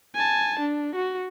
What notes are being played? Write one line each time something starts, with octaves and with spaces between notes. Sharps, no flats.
G#5 A5
D4
F#4